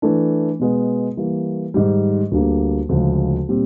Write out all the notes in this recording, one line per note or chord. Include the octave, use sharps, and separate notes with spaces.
E3 A3 D4
B2 G#3 B3
E3 G3 A#3
G#2 D#3 G3
D2 D3 G3 A#3
D2 C#3 F3 G#3
A#2 G3 C4